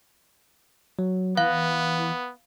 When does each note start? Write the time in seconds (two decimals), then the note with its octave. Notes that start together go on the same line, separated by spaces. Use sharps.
0.99 F#3
1.37 E3 B3 F5 F#6